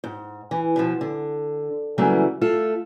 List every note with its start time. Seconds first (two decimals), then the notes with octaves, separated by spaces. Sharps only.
0.04 G#2
0.51 E3
0.76 B2 D3 F3
1.01 D3
1.98 C#3 E3 F#3 G3 A3 A#3
2.41 A3 F4 A4